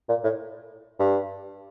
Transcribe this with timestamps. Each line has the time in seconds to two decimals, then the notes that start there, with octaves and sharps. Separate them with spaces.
0.09 A#2
0.23 A2
0.99 G2